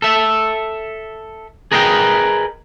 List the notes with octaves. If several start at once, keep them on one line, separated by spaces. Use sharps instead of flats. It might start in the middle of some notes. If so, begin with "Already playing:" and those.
A4 E5
G#4 A#4 B4 D#5 E5 G5